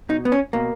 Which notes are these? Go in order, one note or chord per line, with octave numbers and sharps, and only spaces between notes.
B2 D#4
B3
C#4
B2 A#3